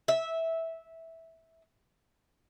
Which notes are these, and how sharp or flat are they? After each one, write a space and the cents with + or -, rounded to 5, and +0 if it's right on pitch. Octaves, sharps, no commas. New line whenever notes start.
E5 -10